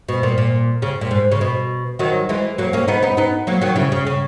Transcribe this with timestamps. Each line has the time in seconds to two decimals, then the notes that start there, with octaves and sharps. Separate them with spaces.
0.09 B2
0.23 A#2
0.38 A#2
0.82 C#3
1.01 A#2
1.11 G#2
1.31 C#3
1.41 B2
1.99 D#3 F#3
2.29 E3 G#3
2.58 F#3 A#3
2.73 A#3 C#4
2.88 B3 D#4
3.03 B3 D#4
3.17 B3 D#4
3.47 F#3 A#3
3.61 D#3 F#3
3.76 C#3 E3
3.92 C#3
4.07 C#3